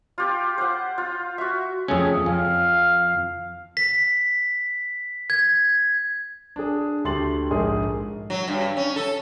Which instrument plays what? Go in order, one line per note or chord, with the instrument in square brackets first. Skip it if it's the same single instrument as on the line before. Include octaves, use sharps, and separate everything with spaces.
[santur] F4 G4
C5 F#5
F4
F#4 E5
[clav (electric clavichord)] F2 A3 C#4 [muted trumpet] G#4
[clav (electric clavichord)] F2 [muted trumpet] F5
[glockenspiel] B6
G#6
[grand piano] D4 G#4
D2 A3 G4 C6 A6 F#7
A#1 G#2 G#4 A#4
[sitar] F#3
G2
C#4
A4